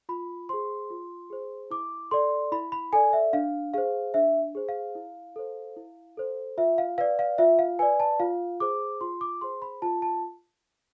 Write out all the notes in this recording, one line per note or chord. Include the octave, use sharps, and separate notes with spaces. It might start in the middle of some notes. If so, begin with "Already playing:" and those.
F4 B5
G#4 C5 C6
F4
G#4 C5
E4 D6
A4 D5 C6
E4 B5
B5
A4 D5 G#5
E5
D4 F5
G#4 C5 F5
D4 E5
G#4 C5
F5
E4
A4 C5
E4
A4 C5
F4 E5
F5
B4 D5 F5
F5
F4 E5
F5
B4 D5 G#5
A5
F4 F5
G#4 C5 D6
F4 C6
D6
G#4 C5 C6
B5
F4 A5
A5